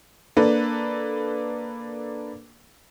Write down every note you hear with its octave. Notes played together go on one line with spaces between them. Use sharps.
A#3 D4 A4 B4